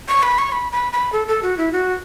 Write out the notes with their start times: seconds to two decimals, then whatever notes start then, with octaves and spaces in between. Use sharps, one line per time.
0.08 C#6
0.23 B5
0.38 C#6
0.52 B5
0.72 B5
0.93 B5
1.12 A4
1.28 A4
1.43 F#4
1.57 E4
1.72 F#4